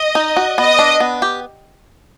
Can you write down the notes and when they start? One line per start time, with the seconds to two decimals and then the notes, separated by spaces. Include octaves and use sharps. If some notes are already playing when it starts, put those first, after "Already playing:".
Already playing: D#5
0.15 D#4
0.36 F#4
0.58 B3 D#5
0.79 D4
1.00 B3
1.22 G4